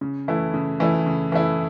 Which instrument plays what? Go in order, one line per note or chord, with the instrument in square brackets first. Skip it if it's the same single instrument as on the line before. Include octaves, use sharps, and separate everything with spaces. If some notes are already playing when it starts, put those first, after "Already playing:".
[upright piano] C#3
E3 A3 E4
C#3
E3 A3 E4
C#3
E3 A3 E4